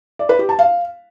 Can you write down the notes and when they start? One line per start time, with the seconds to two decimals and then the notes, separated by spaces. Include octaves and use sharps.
0.19 D5
0.29 B4
0.39 G4
0.49 A5
0.59 F5